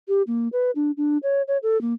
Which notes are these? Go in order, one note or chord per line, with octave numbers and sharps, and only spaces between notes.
G4
A#3
B4
D4
D4
C#5
C#5
A4
A#3